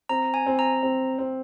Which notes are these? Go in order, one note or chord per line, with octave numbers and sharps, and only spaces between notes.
C4 A#5
G#5
C4
A#5
C4
C4